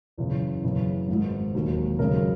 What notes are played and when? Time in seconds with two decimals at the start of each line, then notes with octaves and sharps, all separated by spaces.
0.17 F#1 E2 C#3
0.64 F#1 E2 C#3 E3
1.08 G#1 G#2 E3
1.54 E1 D#2 D#3 F#3
1.99 G#1 F#2 C#3 F#3 A#4